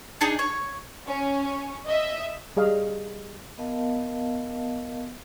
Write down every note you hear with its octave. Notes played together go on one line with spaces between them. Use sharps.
D4 D#4 G#4 D#5
C#5
C#4
D#5 E5
G3 G#4 D#5 F5
B3 A#4 D#5 F5 A5